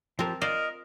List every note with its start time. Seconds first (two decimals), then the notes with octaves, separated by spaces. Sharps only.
0.19 F3 C4 G4 A#4 A5
0.41 F4 A#4 C5 D5 D#5